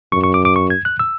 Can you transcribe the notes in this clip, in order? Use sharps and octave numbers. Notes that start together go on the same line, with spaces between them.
F#2 C#6
C#6
D6
D6
C#6
G#6
F#6
E6